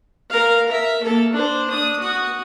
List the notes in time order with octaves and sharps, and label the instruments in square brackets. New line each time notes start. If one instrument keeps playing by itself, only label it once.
[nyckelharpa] A#4 F5
A#4 E5
A#3 A4
D4 C5
D4 D#6
F#4 D#6